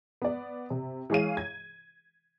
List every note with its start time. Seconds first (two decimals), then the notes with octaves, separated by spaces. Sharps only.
0.22 B3 D5
0.70 C3
1.10 E3 G#3 G#4 C#5 F5 D#7
1.37 G#6